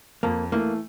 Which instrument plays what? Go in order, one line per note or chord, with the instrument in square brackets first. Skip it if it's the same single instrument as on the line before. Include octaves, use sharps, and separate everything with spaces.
[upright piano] F2 [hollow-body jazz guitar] A#3
[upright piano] E3 A3 [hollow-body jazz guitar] A#3